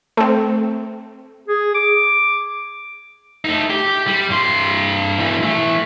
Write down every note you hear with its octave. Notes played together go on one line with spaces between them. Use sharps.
A3 C4
G#4
D6
A3 D#4
G4
G3
G2 C6
B2 E3
E3 A3